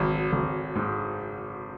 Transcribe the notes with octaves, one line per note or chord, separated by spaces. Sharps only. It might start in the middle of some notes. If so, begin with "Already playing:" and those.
Already playing: G#1 F#3
G#1
G#2